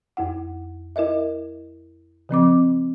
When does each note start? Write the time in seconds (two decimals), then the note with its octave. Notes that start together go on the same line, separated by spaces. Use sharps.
0.17 F2 E4 F#5
0.96 E4 A#4 D#5 E5
2.29 C#3 F3 C4 D6